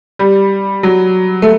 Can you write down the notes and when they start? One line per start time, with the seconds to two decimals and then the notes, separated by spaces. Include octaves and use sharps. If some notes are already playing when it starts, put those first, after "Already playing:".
0.19 G3
0.83 F#3
1.42 A3